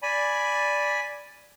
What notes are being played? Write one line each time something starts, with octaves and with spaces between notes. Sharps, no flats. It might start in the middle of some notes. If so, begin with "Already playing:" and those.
D5 G#5 B5